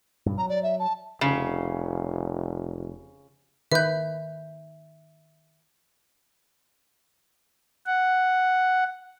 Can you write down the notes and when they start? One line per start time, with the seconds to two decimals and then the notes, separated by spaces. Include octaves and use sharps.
0.26 G2 B2
0.38 F#3 A#5
0.49 D5
0.63 E5
0.79 A5
1.21 F1 C#3
3.72 D#3 B4 E5 G6
7.86 F#5